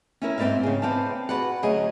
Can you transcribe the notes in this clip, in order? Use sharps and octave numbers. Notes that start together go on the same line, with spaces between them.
C#4 E4 A#4
G#2 C4 A4 D5 E5 F5
C#3 G#4
B3 C4 D5 F5 A5
F#4 G#4 B4 D5 F#5
D2 F#3 C#4 G#4 D#5